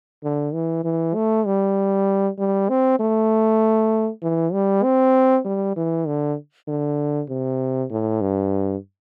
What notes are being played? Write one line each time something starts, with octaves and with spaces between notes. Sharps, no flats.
D3
E3
E3
A3
G3
G3
C4
A3
E3
G3
C4
G3
E3
D3
D3
C3
A2
G2